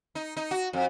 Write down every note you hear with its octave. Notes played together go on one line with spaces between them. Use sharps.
D#4
D#4
F#4
F2